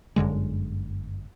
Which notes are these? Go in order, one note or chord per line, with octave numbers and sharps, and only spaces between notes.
G1 F#2 D3 G#3